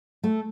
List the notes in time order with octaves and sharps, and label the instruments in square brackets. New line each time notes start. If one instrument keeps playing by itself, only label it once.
[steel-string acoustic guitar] A3